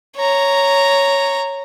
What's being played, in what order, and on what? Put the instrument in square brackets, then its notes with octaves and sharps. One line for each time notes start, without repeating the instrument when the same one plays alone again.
[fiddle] C#5 A#5